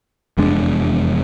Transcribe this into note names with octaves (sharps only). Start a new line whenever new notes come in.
F1 E2 G#3 D4